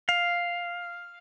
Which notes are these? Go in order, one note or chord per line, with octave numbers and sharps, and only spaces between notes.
F5